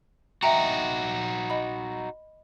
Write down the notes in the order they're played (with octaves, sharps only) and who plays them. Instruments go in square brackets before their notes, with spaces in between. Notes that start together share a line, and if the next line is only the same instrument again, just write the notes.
[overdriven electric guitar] D#4 F#4 [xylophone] E5 G5 A#5
[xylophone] D#5 B5